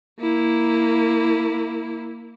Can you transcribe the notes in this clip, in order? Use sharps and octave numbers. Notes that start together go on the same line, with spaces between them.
A#3 E4